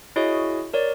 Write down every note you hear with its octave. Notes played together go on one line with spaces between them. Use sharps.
E4 F#4 G#4 C#5 D#5
A#4 C#5 D5